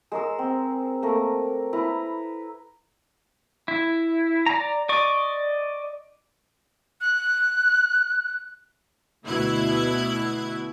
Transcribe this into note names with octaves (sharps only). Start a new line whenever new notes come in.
G#3 A#4 E6
C4
A3 A#3 A#4
E4 B4 A#5 B5
E4
D5 A#5
D5 D#5 C#6
F#6
D2 B2 E4 F#6 G#6